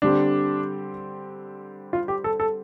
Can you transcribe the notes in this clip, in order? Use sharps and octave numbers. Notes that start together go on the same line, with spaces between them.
D3 G3 C4 D4 G4
F4
G4
A4
A4